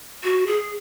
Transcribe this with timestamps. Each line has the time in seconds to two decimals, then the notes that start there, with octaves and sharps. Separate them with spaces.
0.24 F#4
0.47 G#4